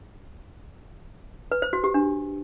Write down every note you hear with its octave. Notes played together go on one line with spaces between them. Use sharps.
B4
C5
F#4
G4
D4